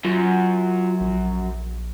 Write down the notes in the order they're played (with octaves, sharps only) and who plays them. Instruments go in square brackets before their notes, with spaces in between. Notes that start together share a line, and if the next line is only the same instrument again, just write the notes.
[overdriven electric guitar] F#2 [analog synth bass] F4
[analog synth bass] A#1